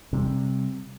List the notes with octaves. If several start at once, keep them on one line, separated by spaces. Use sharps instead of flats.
C3 G3